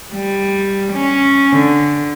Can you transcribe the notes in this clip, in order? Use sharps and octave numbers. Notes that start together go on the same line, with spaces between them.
G3
C#4
D3